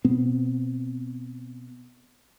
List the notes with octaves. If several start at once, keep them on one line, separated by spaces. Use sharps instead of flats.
B2 B3 C4